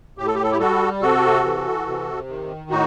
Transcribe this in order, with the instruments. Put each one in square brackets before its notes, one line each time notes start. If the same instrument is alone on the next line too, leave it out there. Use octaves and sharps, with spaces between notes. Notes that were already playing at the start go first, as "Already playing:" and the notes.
[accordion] A2 G4
A4
G4
A4
E4 G4
G3 F#4 A4
C3 F#4 A4
E3
C3
D#3
A2 D#4 F#4